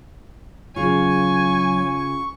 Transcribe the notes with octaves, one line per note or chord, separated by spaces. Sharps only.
C#3 F#3 F4 G#5 C#6